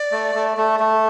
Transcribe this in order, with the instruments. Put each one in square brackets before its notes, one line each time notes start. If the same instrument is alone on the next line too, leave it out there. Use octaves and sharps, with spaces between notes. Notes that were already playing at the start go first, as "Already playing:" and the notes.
Already playing: [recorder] D5
[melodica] A3
A3
A3
A3